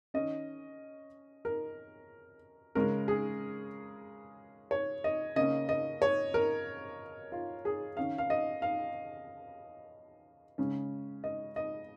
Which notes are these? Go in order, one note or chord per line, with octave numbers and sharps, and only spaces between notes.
D#3 C#4 D#5
A#4
C#3 G#3 C#4 A#4
G#4
C#5
D#5
C#3 A#3 C#4 D#5
D#5
C#5
A#4
F4
G#4
D#3 C#4 F5
F5
D#5
F5
C#3 G#3 C#4
D#5
D#5